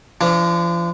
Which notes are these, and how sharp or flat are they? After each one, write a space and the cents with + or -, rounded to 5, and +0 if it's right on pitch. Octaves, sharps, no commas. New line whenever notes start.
F3 -40 D4 -20